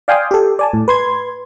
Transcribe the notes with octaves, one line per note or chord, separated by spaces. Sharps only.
D5 F5 G5 G#5 C6 D#6
G4 A4
D5 G#5 A5
A2
B4 C6 G#6